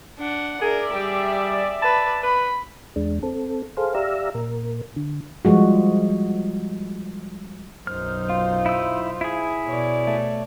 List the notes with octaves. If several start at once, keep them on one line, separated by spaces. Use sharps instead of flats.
D4 F#5
G#4 A#4 D5 E5
G3 G4 G#4
B4 A5
B4 B5
E2 G#3 D4
C4 A4
G#4 A4 C5 F5
G4 D5 E5 F5 A#5 E6
A#2 A#4
D3
F3 G3 G#3 F#4
B1 F#2 D#4 C5 F6
F4
E4 E6
E4 G#4
B2 C#5 D5
A3